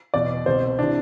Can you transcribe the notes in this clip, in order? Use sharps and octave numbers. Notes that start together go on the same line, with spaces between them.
E2 B2 D5
C2 B2 C5
C3 E3 D4